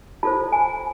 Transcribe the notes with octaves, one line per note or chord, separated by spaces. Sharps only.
F4 A4 C5 A5
G#5